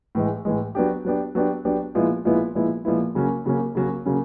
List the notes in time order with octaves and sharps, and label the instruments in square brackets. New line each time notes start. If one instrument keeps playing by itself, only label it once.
[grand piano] A2 E3 G#3
A2 E3 G#3
F#3 B3 D4 G4
F#3 B3 D4 G4
F#3 B3 D4 G4
F#3 B3 D4 G4
A#2 F3 G#3 B3 E4
A#2 F3 G#3 B3 E4
A#2 F3 G#3 B3 E4
A#2 F3 G#3 B3 E4
C#3 F#3 A#3 C#4
C#3 F#3 A#3 C#4
C#3 F#3 A#3 C#4
C#3 F#3 A#3 C#4